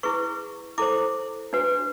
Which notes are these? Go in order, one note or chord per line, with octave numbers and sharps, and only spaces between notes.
E4 G#4 B4 C#6
E4 A4 C5 D6
D4 F#4 B4